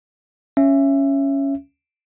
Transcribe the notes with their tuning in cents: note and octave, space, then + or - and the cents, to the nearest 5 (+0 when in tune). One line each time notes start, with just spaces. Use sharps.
C#4 +0 E5 +20